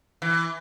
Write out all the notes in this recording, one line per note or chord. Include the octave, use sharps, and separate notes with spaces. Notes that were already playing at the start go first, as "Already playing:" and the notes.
E3